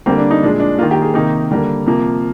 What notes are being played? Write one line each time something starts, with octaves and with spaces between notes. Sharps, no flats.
D3 G3 A#3 C4
D4
D#4
A#2 F3 G#3 D4
D4
D#3 A#3 F4
G4
G#4
C3 D#3 A#3 D#4
D3 G3 A#3
C3 F3 A#3